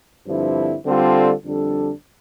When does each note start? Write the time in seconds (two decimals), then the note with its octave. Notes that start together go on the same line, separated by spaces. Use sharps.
0.28 G2 D3 F3 C4 E4
0.86 D3 G3 C4 F4 A4
1.44 F2 D3 G3 D4 A4